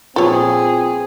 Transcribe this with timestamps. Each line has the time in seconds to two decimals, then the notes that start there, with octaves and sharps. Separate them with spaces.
0.16 A#2 F3 B3 C4 G#4 A4 C#5